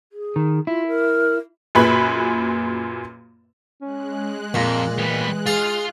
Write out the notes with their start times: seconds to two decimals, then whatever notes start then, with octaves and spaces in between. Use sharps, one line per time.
0.13 G#4
0.36 D#3
0.67 E4 F4
0.88 A#4
1.75 F#2 A#2 G#4 B4 B5
3.82 G#3 C#4 F#6
4.54 F2 A#2 A#3
4.98 E3 G3 B3
5.47 F4 G#4 F5